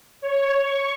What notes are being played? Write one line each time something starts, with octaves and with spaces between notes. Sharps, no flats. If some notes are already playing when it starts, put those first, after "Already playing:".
C#5
C#6